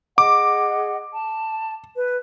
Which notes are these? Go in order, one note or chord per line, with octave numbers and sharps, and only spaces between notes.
G#4 D#5 F#5 D6
A5
B4